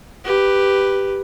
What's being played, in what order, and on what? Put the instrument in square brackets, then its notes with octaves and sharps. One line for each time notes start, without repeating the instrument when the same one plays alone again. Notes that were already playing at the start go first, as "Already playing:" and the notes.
[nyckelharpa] G4 B4